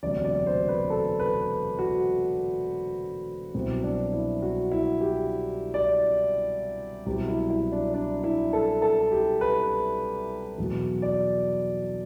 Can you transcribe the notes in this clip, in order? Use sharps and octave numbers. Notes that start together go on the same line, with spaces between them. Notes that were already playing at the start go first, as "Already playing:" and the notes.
E1 D2 C3 F#3 D5
D5
C5
B4
A4
B4
F#4
C2 B2 F#3 C4
D4
E4
F#4
E4
G4
D5
C2 B2 F#3 G4
E4
E4
D4
D4
E4
A4
A4
G4
B4
E2 B2 F#3
D5